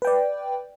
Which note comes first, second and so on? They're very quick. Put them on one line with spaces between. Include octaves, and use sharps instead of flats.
B4 G5 D5